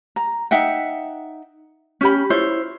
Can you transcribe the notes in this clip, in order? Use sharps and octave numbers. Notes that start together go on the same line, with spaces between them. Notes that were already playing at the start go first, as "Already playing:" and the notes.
A#5
D#4 E5 F#5 G5
C#4 G4 B5
E4 F4 C5 C#5